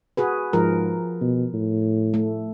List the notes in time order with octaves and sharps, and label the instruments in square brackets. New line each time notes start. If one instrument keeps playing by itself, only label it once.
[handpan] F#4 G#4 B4
[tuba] G#2 [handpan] F3 A#4
[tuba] B2
A2
[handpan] A3